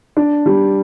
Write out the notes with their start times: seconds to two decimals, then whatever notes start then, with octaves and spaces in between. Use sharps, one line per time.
0.17 D4
0.46 G3